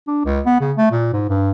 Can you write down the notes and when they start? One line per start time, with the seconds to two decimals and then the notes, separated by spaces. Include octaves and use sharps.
0.07 D4
0.25 C#2
0.46 B3
0.60 C#3
0.77 A3
0.91 A#2
1.13 G#2
1.29 G2